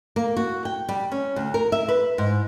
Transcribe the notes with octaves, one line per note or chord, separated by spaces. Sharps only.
A#3
F#4
G5
G3
C#4
D2
A#4
E5
B4
G#2